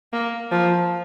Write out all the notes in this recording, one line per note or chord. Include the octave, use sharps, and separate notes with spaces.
A#3
F3